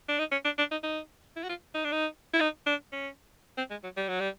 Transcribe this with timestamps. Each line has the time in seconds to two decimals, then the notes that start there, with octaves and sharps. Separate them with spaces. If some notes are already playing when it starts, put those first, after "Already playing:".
0.09 D4
0.19 D#4
0.31 C#4
0.45 D4
0.58 D4
0.71 D#4
0.83 D#4
1.36 E4
1.44 F#4
1.49 F4
1.74 D#4
1.84 D4
1.92 D#4
2.33 E4
2.40 D#4
2.66 D4
2.92 C#4
3.57 C4
3.70 G#3
3.84 F#3
3.97 G3
4.08 F#3
4.20 G3